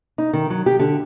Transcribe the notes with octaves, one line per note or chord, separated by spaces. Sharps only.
D#4
D#3
F#3
G4
D3